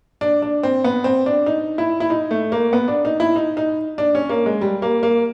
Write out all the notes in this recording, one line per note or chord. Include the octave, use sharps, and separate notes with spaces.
D4
D4
C4
B3
C4
D4
D#4
E4
E4
D#4
A3
A#3
B3
D4
D#4
E4
D#4
D#4
D4
C#4
A#3
G#3
G3
A#3
A#3